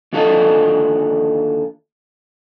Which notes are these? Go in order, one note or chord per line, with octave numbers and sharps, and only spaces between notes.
D#2 D3 F4 F#4 A4 D#5